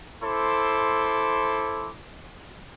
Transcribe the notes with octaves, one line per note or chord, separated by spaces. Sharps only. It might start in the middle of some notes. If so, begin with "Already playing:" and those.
E4 A4 C5 C6 D6